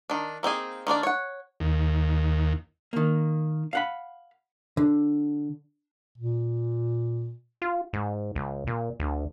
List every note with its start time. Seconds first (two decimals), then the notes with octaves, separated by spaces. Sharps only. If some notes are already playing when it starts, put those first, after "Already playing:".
0.10 D#3 D4
0.43 A#3 C4 D#4 G#4
0.87 D#3 A#3 D4 D5
1.03 C#5 F#5
1.60 D#2
2.93 D#3 A#3
3.73 F5 F#5 B5
4.77 D3
6.18 A#2
7.62 F4
7.93 G#2
8.35 C#2
8.67 A#2
9.00 D2